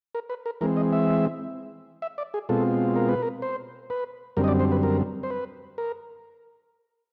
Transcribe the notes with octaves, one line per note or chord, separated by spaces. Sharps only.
A#4
B4
A#4
E3 G#3 C4 A#4
D#5
E5
E5
D5
G#4
B2 G#3 C4 F4 A4
A#4
B4
A#4
C5
B4
F#2 D3 G3 C4 A#4
D#5
D5
C5
B4
A#4
C5
B4
A#4